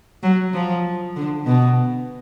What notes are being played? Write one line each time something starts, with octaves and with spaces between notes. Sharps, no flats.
F#3
F3
D3
B2